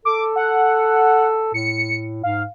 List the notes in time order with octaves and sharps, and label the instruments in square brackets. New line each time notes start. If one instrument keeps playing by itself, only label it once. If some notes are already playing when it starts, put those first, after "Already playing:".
[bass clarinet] A4 [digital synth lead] D6
[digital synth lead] F#5
[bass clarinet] A2 [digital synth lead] C#7
[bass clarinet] G#2 [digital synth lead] F5